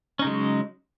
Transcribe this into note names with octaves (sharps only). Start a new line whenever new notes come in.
C#3 F#3 G#3 C#4 D#4